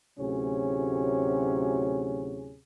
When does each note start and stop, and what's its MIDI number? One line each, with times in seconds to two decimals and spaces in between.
0.19 2.59 38
0.19 2.59 45
0.19 2.59 48
0.19 2.59 54
0.19 2.59 61
0.19 2.59 68